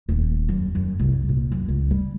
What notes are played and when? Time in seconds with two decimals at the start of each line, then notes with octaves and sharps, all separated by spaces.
0.09 D#1
0.49 F#2
0.75 F#2
0.99 C2
1.29 A#2
1.52 F#2
1.68 C#2
1.90 G3